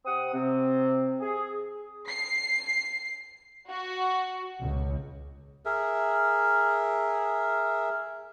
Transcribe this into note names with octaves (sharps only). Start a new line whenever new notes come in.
C3 C4 F#5 D#6
C3 C4
G#4
C7
F#4
C#2
G#4 A#4 E5